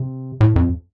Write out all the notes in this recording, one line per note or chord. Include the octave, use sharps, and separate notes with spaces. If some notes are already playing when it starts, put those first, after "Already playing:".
Already playing: C3
A2
F2